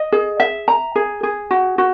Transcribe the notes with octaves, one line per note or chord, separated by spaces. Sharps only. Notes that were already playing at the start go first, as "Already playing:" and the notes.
Already playing: D#5
G#4
E5
A#5
G#4
G#4
F#4
F#4